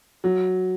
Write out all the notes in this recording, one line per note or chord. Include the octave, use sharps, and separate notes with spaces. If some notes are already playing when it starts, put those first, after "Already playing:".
F#3